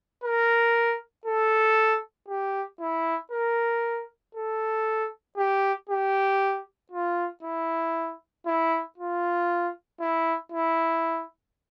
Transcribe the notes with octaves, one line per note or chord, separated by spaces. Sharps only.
A#4
A4
G4
E4
A#4
A4
G4
G4
F4
E4
E4
F4
E4
E4